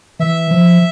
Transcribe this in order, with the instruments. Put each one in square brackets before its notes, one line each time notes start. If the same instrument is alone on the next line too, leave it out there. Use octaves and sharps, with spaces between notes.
[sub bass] E3 [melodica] E5
[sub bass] F3